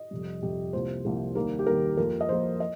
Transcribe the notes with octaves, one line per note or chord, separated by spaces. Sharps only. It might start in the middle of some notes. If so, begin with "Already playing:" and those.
Already playing: D#5
F2 C3 G3
F2 C3 G3 G4
C2 C3 F3 A#3 C5
C2 C3 F3 A#3
D#2 D#3 G3 A#3 A#4
G4
D#2 D#3 G3 A#3 A#4
F2 F3 A#3 A#4
D#5
F2 F3 A#3 C5
D#5